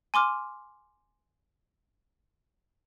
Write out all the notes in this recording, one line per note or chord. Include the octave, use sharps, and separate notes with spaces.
G#5 C6 D6 F6